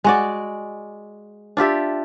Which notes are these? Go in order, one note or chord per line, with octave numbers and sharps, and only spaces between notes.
G#3 F#4 D5
D4 F4 G4 E5